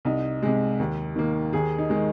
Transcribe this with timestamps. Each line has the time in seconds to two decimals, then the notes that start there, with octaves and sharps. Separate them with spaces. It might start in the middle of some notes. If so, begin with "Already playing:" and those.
0.05 C2 D#4
0.43 C3 G#3
0.80 D#2
1.16 D#3 A#3
1.53 D#2 G#4
1.78 D#4
1.90 D#3 G#3